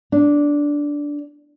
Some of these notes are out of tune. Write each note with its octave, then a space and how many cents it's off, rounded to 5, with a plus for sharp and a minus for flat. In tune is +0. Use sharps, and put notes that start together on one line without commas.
D4 -10